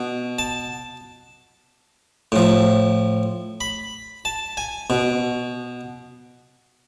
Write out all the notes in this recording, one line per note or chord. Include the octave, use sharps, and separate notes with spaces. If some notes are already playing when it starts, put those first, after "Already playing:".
Already playing: B2
A5
A2 F3
B5
A5
G#5
B2